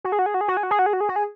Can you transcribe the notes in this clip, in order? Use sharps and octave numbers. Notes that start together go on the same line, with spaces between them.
F#4
G#4
F#4
G#4
F#4
G#4
F#4
G#4
F#4
G#4
F#4
G#4
F#4
G#4
F#4
G#4